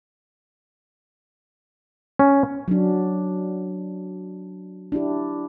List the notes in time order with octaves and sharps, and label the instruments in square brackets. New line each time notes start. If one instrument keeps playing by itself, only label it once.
[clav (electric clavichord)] C#4
[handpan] F#3 D4
D4 E4 G4